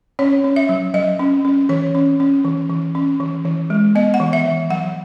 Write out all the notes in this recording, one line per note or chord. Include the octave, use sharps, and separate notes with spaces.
C#4 C#5
C#4
E5
F#3
F#3 D#5
C#4
C#4
E3 C#5
C#4
C#4
E3
E3
C#4
E3
E3
G#3
B3 D#5
F#5
E3
E5
E3
F#3 F#5